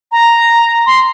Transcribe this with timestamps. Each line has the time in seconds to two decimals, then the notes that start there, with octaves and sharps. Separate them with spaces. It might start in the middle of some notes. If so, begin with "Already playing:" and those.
0.12 A#5
0.87 C6